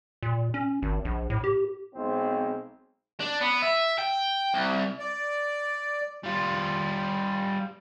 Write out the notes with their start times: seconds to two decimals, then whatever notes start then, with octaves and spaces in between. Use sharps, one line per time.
0.23 A#2
0.54 C#4
0.83 G#1
1.05 A#1
1.30 A2
1.44 G4
1.95 B1 G#3 C4
3.20 D4
3.41 B3
3.62 E5
3.98 G5
4.54 C2
4.99 D5
6.23 G3 F4